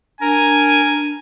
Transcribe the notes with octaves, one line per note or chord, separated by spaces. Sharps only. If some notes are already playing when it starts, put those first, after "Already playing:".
D4 A#4 G#5